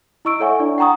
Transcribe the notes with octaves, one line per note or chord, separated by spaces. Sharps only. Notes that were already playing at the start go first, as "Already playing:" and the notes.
E4 D#5 C#6 E6 D7
A4 C#5 E5 F#5 G#5 C#6
D4 E4 D5
F#5 G5 A#5 C#6 D#6